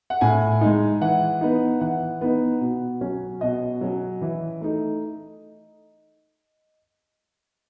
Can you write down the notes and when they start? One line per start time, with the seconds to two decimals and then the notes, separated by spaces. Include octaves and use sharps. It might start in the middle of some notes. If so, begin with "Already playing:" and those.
0.10 F#5
0.21 A2 G#5
0.61 G#3 D#4
1.01 E3 F#5
1.41 B3 D#4
1.81 E3 F#5
2.21 B3 D#4
2.61 B2
3.01 F#3 C#4
3.41 B2 D#5
3.81 F#3 C#4
4.21 E3
4.61 A3 D#4